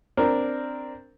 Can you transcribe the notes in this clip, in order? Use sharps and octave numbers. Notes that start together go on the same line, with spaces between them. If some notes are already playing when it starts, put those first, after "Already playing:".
C4 D4 A#4